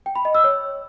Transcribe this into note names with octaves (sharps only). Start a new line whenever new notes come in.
G5
B5
D#5
E6
C#5